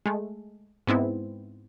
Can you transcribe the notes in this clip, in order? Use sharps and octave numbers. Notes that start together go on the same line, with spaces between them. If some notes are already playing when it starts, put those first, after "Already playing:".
G#3 A3
G#2 B3 C4 E4